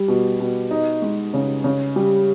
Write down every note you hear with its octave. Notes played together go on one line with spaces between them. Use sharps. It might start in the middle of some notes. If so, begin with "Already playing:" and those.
Already playing: G3
B2
B2
D#4
G#3
C#3
C#3
G3